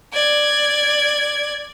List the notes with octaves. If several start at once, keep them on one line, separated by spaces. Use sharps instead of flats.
D5 G#6